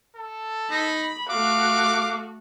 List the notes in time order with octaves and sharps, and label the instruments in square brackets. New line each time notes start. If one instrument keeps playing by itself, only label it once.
[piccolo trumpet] A4
[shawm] D#4 [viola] B5
[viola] A3 F#4 [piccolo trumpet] F5 [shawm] D6